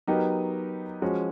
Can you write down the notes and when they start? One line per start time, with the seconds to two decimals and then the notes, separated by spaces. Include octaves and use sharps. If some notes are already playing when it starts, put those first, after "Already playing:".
0.07 F#3 B3 D#4 G4 A#4
1.02 F3 G#3 C#4 F#4